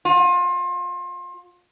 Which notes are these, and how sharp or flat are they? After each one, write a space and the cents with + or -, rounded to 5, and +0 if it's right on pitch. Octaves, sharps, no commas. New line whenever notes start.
F4 +30